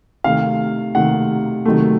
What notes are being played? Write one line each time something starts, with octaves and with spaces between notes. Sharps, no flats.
C3 D#3 A3 F5
C3 D#3 A3 F#5
C3 D#3 F#3 A3